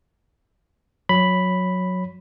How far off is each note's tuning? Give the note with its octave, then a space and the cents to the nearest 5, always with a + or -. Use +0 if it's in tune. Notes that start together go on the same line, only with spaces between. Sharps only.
F#3 -20 C#5 +0 B5 +0